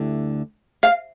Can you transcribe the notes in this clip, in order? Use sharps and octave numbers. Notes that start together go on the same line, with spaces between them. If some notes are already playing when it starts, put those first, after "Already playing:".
Already playing: D2 D3 A3 E4 G4
F5